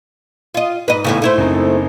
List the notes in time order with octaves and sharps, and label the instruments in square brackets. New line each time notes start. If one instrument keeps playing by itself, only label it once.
[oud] F4 D#5
[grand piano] G#2 [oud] B4 D#5
[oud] E2 A2 C#3
A3 E4 C5
[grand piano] F#1 C4 D#4